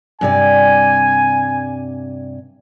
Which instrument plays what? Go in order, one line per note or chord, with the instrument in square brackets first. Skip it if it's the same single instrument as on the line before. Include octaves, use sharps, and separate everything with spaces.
[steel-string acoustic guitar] G2 C3 D5 [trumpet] G#5